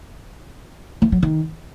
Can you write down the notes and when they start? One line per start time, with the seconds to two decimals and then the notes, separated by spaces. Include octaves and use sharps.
1.02 E3
1.12 F#3
1.23 D#3